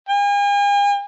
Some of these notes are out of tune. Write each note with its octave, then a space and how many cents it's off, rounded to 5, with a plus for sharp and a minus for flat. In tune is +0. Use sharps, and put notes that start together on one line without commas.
G#5 -45